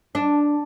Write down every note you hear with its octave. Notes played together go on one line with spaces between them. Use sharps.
D4